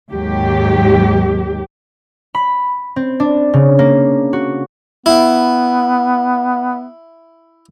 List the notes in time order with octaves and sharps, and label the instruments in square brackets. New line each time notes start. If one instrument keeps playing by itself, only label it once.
[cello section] D#2 G#2 F#3 G4
[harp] B5
C4
D4
C#3
A#3
F#4
[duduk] B3 [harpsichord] E4